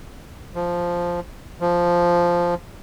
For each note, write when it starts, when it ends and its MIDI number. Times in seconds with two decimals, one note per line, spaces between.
0.55 1.20 53
1.60 2.55 53